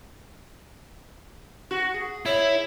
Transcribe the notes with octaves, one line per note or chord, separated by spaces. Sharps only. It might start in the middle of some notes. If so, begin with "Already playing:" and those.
F#4
G#4
E4 C#5